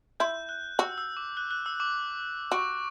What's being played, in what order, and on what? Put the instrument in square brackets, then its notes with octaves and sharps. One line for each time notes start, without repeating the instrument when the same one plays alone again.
[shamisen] E4 [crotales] G6
[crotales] F#6
[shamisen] F#4 [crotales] E6
[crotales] E6
D6
F#6
F#6
E6
D6
[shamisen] F#4 [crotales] C#6